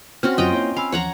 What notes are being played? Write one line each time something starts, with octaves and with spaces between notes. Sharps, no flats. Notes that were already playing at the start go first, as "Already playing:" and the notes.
C4 C#4 F#4 F6
F#2 F#3 F4 D#5 G5 D#6
A#3 E4 C#5
F5 G#5 B5 E6
D#2 E3 F3 C#5 F#5 A#5